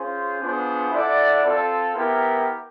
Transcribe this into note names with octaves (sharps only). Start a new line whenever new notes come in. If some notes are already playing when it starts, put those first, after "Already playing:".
Already playing: C#4 F4 G#4 C5
B3 D4 F4 G#4 C5
E4 A4 D5 F#5
C4 F4 A4
B3 E4 G4 A#4